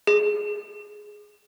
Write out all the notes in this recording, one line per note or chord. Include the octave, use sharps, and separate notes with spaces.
G#4